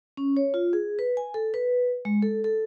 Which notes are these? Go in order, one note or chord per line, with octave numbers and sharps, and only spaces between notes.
C#4
C#5
F4
G#4
B4
G#5
A4
B4
G#3
A4
A4